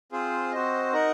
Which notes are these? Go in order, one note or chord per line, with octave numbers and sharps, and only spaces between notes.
C4 F4 G#4 C5
C4 F#4 C5 D#5
D#4 A#4 D#5 F#5